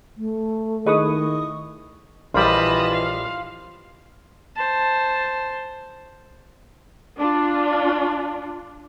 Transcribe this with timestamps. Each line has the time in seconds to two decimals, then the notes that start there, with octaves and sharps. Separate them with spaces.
0.17 A3
0.86 D#3 E4 G#4 B4 D#5 C#6 D#6
2.34 A#1 E3 G3 F4 D#5 A5 B5
2.92 F5
4.56 C5 A5
7.18 D4 F4